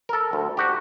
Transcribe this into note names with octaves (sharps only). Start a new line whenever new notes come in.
A4 A#4
D2
F#4 G4